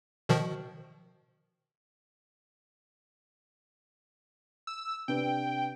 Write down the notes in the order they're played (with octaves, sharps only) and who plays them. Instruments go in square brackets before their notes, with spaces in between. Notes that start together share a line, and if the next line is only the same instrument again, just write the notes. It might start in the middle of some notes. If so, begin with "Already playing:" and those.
[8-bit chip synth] B2 D#3 F3
[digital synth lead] E6
[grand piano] C3 D4 B4 [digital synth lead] G5